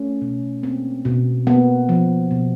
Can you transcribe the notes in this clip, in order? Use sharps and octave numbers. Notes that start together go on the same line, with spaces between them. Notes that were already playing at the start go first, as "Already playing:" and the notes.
Already playing: A3 C#4
B2
A#3 C4
B2
A#3 B3
F3
B2